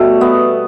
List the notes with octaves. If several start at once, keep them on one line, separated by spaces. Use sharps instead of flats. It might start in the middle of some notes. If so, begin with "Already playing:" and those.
Already playing: B2 G3 A3
B3